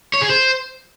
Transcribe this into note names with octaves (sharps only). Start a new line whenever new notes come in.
C#5
G#4
C5